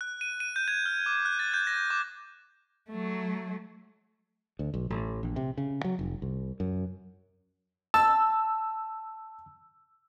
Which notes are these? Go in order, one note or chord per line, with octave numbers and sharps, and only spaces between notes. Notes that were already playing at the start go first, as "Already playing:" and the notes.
F#6
D#7
D#7
G6
G#6
F6
D6
F#6
A6
G6
A#6
D6
F#3 A3
D2
B1
A1
A#1
C3
C#3
F#3
F1
C2
F#2
A5 E6